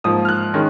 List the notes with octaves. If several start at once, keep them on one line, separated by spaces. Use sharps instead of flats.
G#2 F3 A#3 D#6
F6
F#6
D#3 G#3 C#4